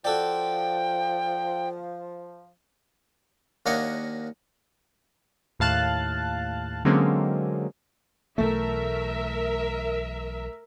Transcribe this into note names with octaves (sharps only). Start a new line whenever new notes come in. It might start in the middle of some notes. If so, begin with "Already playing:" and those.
F3 F#4 A4 D5 G5
D#2 A#3 D4 C#5 D#5 F#5
D#2 A2 F5 A5 F#6
D3 F#3 G#3 A#3 C4 C#4
B1 E3 A3 A#4 E5